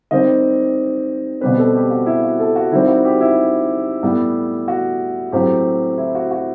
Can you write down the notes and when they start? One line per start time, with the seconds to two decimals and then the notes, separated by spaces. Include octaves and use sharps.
0.11 D#3 G3 C4 D#5
1.41 B2 G3 C4 B4
1.58 A4
1.75 G4
1.90 F#4
2.06 E4
2.23 F#4
2.39 A4
2.56 F#4
2.72 D#3 G3 C4 E4
2.88 F#4
3.05 G4
3.21 E4
4.03 A2 G3 B3
4.68 F#4
5.32 A2 F#3 C4 G4
5.98 E4
6.15 F#4
6.31 F#4